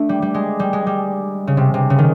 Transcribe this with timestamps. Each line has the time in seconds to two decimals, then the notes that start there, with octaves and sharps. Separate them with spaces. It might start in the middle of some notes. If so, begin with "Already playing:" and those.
Already playing: A3 D4
0.09 G3
0.22 G3
0.34 G#3
0.59 G3
0.73 G#3
0.87 G3
1.47 C#3
1.57 C3
1.74 C3
1.90 C#3
1.98 D#3